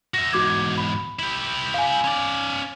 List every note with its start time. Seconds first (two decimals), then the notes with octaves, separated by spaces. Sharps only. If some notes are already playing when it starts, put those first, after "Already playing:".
0.14 F#4 E5 A#6
0.33 E2 G#2 F#4 D6 G#6
0.78 B5
1.19 E4 G4
1.74 F5 G#5
2.04 C#4 D5